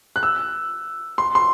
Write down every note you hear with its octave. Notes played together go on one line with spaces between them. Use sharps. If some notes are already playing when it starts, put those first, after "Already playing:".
F#6
E6
C6
C6